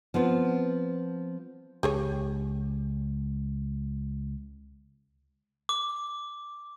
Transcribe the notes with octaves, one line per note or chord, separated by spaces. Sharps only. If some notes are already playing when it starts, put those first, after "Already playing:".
F3 B3 C4 F4
C#2 G4 G#4 C#5
D6